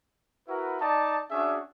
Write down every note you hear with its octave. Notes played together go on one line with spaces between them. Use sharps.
E4 F#4 A#4 B4
D#4 D5 A5
C#4 D4 F#4 G#4 E5